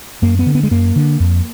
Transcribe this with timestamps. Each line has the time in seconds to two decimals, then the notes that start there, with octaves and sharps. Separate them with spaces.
0.22 F#2 A#3
0.39 B3
0.46 D3
0.55 B3
0.63 G#3
0.71 F#2 A#3
0.96 D3
1.20 F2